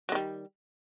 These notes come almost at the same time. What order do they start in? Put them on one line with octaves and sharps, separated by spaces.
F#3 D#3 G3